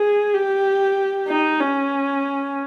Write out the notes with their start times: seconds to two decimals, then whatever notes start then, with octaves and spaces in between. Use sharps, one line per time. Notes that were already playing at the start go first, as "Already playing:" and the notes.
Already playing: G#4
0.34 G4
1.28 D#4
1.60 C#4